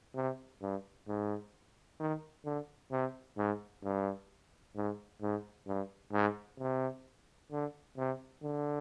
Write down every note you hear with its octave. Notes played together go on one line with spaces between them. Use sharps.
C3
G2
G#2
D#3
D3
C3
G#2
G2
G#2
G#2
G2
G#2
C3
D3
C3
D3